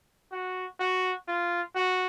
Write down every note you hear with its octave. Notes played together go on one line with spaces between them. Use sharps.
F#4
F#4
F4
F#4